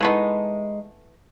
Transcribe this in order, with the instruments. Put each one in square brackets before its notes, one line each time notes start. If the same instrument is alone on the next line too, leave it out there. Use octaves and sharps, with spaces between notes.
[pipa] E3 A3 B3 [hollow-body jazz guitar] G#3 D#4